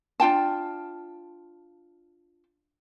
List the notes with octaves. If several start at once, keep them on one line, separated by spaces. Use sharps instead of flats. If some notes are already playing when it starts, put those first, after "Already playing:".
D4 F4 G5 A5